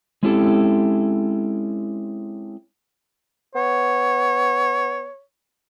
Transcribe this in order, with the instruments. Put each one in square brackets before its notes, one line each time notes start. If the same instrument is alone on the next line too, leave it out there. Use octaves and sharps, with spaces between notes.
[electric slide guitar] G#3 C4 C#4 E4 G4 A4
[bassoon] B3 [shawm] C#5